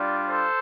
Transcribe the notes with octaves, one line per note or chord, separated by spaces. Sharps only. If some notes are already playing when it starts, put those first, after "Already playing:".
Already playing: G3 D4 F4
A4 C5